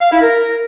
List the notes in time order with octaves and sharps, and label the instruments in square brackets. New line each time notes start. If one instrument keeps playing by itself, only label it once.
[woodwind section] F5
E4
A#4